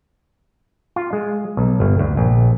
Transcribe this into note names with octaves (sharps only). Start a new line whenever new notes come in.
F4
G#3
B1
G1
D2
A#1